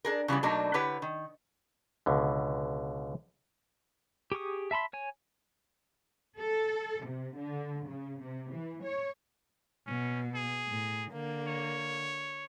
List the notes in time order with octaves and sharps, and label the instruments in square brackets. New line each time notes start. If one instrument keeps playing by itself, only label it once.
[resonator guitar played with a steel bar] D4 G#4 A#4
C#3 E3 G3 B3
B2 F#3 A3 A#3 D4 D#4
D3 E4 G4 B4 C#5 F#5
D#3
[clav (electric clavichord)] C#2 B2 D3
[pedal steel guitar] G4 G#4 C#6 D#6
E5 A5 B5 C6
C#5 G#5
[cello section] A4
C3
D3
C#3
C3
E3
C#5
[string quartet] B2 [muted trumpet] C#4
[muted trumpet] G#4
[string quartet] A2
D3 A#3
[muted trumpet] C#5